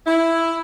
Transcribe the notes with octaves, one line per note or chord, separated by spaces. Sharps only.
E4